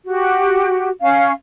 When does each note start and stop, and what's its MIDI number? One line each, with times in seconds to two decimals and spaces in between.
0.06 0.89 66
0.06 0.89 67
1.01 1.32 61
1.01 1.32 77